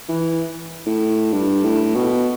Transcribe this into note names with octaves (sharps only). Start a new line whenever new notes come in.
E3
A2
G2
A2
B2